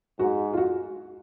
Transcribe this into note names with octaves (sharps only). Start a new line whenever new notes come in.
G#2 F#4
F4
F#4